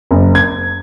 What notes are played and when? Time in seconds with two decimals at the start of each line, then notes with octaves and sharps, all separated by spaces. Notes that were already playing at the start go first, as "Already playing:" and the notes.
0.11 F#1
0.35 G#6